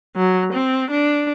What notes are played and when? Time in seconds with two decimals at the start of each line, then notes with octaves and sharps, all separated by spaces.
0.16 F#3
0.53 C4
0.91 D4